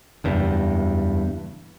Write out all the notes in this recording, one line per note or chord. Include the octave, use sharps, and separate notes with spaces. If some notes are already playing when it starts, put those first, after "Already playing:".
F#1 E2 G2